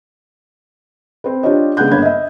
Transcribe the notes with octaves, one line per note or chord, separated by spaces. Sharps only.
C4 B4
D4 F4 G4 C#5 D#5
C#3 G#3 B3 D4 F#6 G6
G1 A#3 C#5 B5 G#6
D#5 E5